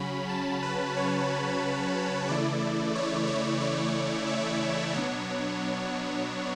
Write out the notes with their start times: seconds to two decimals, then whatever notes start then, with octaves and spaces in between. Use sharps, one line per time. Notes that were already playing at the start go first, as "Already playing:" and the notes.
Already playing: C#3 F#3 C#4 B5
0.29 A5
0.63 B4
0.97 C#5
2.28 C#3 E3 A3 E4 D5
2.95 C#5
3.27 C#5
3.61 D5
4.27 E5
4.94 B2 F#3 B3 D4 C#5